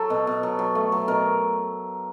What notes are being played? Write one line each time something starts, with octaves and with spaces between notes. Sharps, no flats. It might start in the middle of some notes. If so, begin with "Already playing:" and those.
Already playing: F#3 A4
B2
B2
F#3
F#3
A3
F#3
B2 A#4